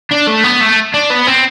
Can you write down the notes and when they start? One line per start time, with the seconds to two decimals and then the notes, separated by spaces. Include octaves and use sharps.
0.11 D4
0.27 A3
0.44 B3
0.60 A3
0.94 D4
1.10 B3
1.27 C4